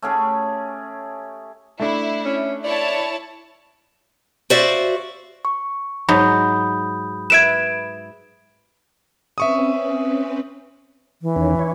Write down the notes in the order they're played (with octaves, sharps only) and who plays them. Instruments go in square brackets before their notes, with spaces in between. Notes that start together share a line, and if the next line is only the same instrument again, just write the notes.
[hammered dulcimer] A3 C#4 G4 G#4
[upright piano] A3 D4 [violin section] E4
[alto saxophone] C#4
[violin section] E4 C#5 A5 [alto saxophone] D5
[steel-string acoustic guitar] F#4 C5 D5 E5 F5
[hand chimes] C#6
[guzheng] G#2 F#3 [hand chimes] B5 D#6 G6
[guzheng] B4 E5 [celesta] G#6 D7 E7
[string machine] C4 C#4 B4 [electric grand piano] E5 C#6 D#6
[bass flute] E3
[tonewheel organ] E2 D#3 C#4
E4 C#5